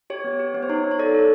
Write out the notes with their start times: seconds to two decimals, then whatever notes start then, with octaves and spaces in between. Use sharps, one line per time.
0.10 G4 C#5
0.24 B3
0.40 G4
0.54 B3 C#5
0.63 C5
0.69 D#4 C#5
0.84 D#4
0.91 C#5
0.99 A4 D5
1.14 A4